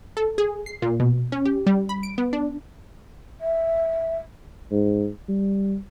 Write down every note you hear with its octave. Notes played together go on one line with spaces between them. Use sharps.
A4
G#4
C7
A#2
B2
C#4
G4
G3
B5
D7
B3
D4
E5
G#2
G3